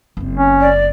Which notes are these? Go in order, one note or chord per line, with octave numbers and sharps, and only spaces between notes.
F#1 C4
C#4
D5